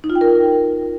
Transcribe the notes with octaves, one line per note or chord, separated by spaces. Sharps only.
D#4
F4
G5
A#4